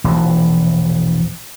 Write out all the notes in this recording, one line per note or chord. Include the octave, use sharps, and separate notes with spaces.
E1 A#1 A#2